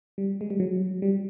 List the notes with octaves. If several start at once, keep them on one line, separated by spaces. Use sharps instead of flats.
G3
G#3
G3
F#3
G3